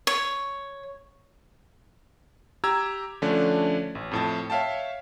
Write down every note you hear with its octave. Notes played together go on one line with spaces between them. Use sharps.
C#5
G4 A#5 E6 G#6
D3 F3 A3 C#4 D4
A1
F2 A2 A5
C#5 E5 F5 G5 A5